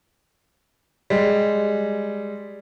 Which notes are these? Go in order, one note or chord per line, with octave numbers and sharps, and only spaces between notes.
G3 G#3